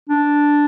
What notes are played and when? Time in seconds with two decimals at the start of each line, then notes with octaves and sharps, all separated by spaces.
0.09 D4